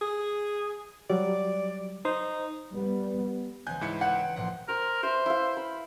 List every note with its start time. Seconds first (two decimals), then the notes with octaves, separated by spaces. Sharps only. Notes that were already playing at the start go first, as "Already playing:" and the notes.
0.02 G#4
1.10 F#3 G3 D5
2.05 D#4 C5
2.72 G3 B3
3.67 C#2 E3 G#5 F#6 G6
3.81 G#2 E4 C#7
4.01 F#5 G6
4.15 G5
4.36 A#1 A2 F#5 C6
4.68 A#4 C5
5.03 B4 C5 E5
5.26 E4 F5
5.57 B5